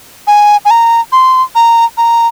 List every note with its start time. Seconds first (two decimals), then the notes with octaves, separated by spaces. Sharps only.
0.27 G#5
0.65 G#5
0.71 A#5
1.12 C6
1.55 A#5
1.97 A#5